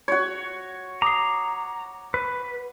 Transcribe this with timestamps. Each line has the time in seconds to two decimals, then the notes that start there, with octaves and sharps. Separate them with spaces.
0.08 F#4 C#5
1.02 A#5 D6 D#6 C7
2.14 B4